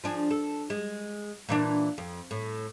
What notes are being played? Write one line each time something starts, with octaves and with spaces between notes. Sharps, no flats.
F3 D4 G#4
A4
G#3
A#2 E3 D4
F2
A2